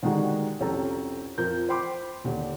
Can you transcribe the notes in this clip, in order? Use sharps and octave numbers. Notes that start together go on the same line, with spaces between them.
D3 D#3 G3 G#3 D#4 F#4
C2 F2 C#4 A4 G5 A#5
F2 F3 A#4 G6
C5 G5 B5 C6 D6
D#2 D3